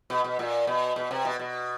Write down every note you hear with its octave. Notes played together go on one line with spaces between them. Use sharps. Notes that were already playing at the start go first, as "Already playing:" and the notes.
B2
B2
A#2
B2
B2
C3
B2
B2